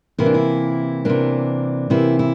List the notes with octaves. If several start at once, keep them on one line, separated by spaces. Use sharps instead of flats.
C3 E3 A#3 E4
D4
E4
C3 E3 A#3 D4
C3 E3 A#3 E4
E4